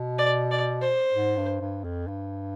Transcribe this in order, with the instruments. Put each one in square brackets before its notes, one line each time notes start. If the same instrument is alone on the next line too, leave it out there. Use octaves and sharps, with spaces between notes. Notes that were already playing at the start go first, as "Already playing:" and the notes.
Already playing: [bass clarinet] B2
[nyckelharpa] D5
D5
C5
[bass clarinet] G#2
G2
G2
F2
G2